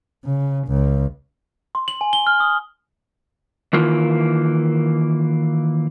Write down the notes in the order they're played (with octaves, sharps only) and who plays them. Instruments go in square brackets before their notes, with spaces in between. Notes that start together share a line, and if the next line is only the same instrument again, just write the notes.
[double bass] C#3
C#2
[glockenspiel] C6
F#7
G#5
G7
F6
D#6
[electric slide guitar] D#3 E3 A#3 F4